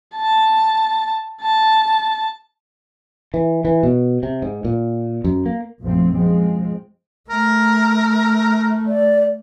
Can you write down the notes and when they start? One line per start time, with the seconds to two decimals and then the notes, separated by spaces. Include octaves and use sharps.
0.16 A5
1.42 A5
3.34 E3
3.65 E3
3.83 B2
4.23 C3
4.42 G#2
4.65 A#2
5.24 F#2
5.46 A#3
5.83 A#1 F#2 F3 A3 C4
6.14 F3 G#3 C4
7.30 A3 A#4
8.87 D5